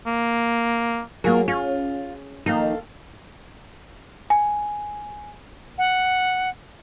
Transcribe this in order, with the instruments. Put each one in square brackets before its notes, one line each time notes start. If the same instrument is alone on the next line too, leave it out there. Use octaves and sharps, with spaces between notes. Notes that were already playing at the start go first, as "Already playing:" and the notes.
[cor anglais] A#3
[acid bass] F#3 [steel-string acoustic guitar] A#3 F4 A#4 [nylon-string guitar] G#4
[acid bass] C#4 [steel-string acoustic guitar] F4
[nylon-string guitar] D#3 F3 A#3 [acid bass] D#4 [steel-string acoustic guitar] A4 F5
[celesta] G#5
[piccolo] F#5